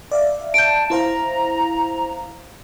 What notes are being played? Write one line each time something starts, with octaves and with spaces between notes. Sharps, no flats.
D5 E5 F5
A5 G6 D7
E4 C5 F5 A#5